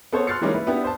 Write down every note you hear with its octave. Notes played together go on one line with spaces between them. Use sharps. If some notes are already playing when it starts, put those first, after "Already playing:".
B3 A4 C5 C#5
C6 F6 F#6 A6 C7 C#7
E3 G3 G#3 A#3 C#4 D#4
E4 B4
B3 D4 E4 G4
C5 A5